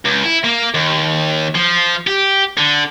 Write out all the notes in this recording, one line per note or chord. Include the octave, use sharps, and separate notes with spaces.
C#2
E4
A#3
D#2
F3
G4
D3